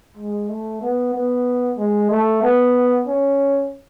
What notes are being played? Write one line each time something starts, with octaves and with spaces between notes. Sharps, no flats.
G#3
A3
B3
B3
G#3
A3
B3
C#4